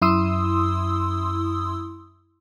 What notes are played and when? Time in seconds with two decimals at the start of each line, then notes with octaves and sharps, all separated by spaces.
0.02 F#2 E4 C6 D#6 E6